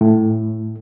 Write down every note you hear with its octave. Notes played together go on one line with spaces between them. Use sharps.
A2